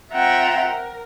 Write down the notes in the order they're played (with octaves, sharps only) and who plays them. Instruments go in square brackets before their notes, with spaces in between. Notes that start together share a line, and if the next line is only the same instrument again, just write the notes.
[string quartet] C4 F4 E5 F#5 G5 A#5
A#4